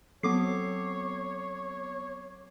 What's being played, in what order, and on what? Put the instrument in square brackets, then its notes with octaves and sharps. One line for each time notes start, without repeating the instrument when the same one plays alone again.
[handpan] F#3 C4 A4 [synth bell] B3 D6 C7 [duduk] C#5